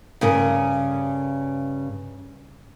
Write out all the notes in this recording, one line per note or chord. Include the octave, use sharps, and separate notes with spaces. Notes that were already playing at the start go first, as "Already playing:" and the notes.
G2 C#3 A#4